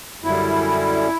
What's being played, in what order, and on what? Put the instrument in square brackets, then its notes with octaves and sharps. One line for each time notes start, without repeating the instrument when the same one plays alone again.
[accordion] F#2 D3 G3 E4